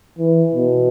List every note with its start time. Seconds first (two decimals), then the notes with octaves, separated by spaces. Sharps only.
0.19 E3
0.54 B2